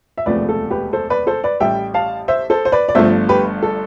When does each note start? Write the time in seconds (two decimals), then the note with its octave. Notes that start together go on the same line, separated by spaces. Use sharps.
0.18 E5
0.26 E1 D2 C3 F3 A3 B4 D5
0.49 A4
0.70 G4 B4
0.93 A4 C5
1.10 B4 D5
1.27 A4 C5
1.44 B4 D5
1.60 A1 A2 G3 E5 G5
1.94 F5 A5
2.28 C5 E5
2.50 A4 C5
2.65 C5
2.72 B4 D5
2.88 D5
2.95 G1 G2 F3 A3 C5 E5
3.29 G4 B4
3.62 A4